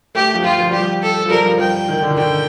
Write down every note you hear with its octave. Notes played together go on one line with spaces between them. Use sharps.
A3 G4
F3
F3 F4
F3
G3 G4
F3
A4
F3
G3 A#4
F3
F3 G5
D#3
D3
D#3
D3 G5